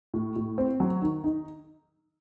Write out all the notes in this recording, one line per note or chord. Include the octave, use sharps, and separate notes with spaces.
A2
A2
C4
F#3
D#3
D#4